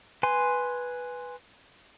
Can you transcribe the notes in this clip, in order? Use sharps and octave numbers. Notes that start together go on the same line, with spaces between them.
B4 G#5 C6